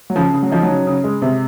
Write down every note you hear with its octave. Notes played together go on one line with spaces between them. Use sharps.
F#3
C#3 F3
C#3
F#3
F3 D#4
F#3
C#3
C#3
G#3
C3